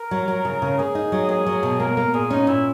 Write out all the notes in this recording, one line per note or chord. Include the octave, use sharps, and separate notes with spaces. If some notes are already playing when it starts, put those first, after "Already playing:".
Already playing: A#4
F#3
F#3
C#3
C#3
A#3 G#4
D#4
F#3
A#3 G#4
F#3
B2
A#3 A#4
A#3 A#4
A#2 G#4
C#4 D#4
A#2 E4